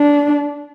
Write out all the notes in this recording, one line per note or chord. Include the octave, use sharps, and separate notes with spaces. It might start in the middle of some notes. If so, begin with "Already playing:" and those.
Already playing: D4